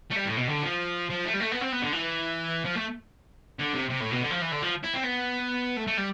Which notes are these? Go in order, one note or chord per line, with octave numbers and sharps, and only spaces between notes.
A3
G3
A2
B2
D3
F3
F3
A3
G3
A3
B3
C4
B3
D3
E3
F3
A3
D3
C3
C3
A2
B2
D3
F3
E3
D3
F3
E4
C4
B3
A3
A3
G3